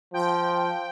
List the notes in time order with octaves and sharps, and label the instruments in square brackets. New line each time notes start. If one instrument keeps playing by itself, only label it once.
[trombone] F3 [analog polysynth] G5